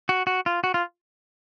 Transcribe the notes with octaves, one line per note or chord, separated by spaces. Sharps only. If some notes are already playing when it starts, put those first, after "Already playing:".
F#4
F#4
F4
F#4
F4